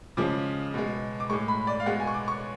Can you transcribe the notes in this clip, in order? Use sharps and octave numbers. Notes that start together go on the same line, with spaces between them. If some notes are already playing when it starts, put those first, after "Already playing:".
C#3 F3 G#3 D6
B2 G#3
D6
A2 G#3 C#6
B5
D5
F5
B2 G#3 F#5
G#5
C#6
D6
C#6